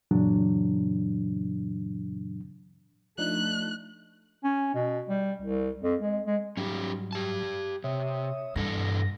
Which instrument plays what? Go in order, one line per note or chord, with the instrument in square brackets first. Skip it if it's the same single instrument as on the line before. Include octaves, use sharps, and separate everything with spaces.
[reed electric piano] F#2 A#2 C#3 E3 F#3 D4
[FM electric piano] F3 D4 D#4 [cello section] A3 [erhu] F#6
[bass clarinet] C#4
B2
G3
C2
F2
G#3
G#3
[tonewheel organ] G#2 F#3 G3 [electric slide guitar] C#4 D#4 G4
[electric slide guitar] G4 A5
[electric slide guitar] C3 [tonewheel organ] C#5 E5 D#6
[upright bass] G2 [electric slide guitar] B2 E3 A4 [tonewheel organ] A#6